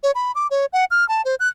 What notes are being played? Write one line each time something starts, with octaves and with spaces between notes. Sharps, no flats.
C#5
B5
D6
C#5
F#5
F6
A5
C5
F#6